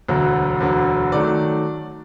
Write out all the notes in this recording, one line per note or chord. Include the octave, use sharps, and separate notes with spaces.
E1 D2 D3 F#3
E1 D2 D3 F#3
D#3 F#3 A3 D5